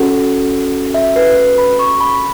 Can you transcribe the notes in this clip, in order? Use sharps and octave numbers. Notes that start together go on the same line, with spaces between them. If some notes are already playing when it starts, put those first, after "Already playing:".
Already playing: C#4 F#4 A4 F#5
E5
B4
B4
B5
C#6
B5